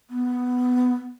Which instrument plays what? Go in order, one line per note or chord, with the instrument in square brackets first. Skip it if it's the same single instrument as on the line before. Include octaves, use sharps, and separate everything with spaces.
[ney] B3